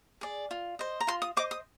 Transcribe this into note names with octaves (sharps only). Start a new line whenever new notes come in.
G#4 D5
F4
C5 D#5
A#5
F4 C6
D#6
C5 D#5 D6
D#6